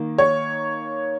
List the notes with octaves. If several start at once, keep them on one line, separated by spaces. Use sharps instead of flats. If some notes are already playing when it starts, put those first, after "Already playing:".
Already playing: D#3 A#3
C#5